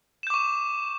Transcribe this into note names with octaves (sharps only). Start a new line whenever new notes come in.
C#6 D6 G6 E7